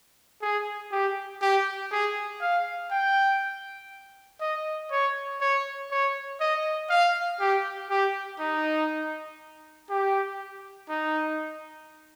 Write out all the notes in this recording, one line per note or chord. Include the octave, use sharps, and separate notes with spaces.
G#4
G4
G4
G#4
F5
G5
D#5
C#5
C#5
C#5
D#5
F5
G4
G4
D#4
G4
D#4